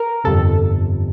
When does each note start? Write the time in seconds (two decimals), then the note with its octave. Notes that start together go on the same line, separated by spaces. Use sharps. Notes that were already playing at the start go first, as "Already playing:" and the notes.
Already playing: A#4
0.24 G1 F2 C3 A4